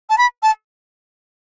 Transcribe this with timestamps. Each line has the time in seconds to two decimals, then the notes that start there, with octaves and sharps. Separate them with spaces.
0.10 A5
0.18 B5
0.43 A5